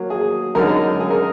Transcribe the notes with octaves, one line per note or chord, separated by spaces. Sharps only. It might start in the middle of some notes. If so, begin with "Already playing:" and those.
Already playing: F#3 A#3
G#4
F#2 D3 G#3 D#4 A#4
G#4
A#4